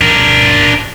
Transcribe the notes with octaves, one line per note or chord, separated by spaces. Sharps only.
D4 A#4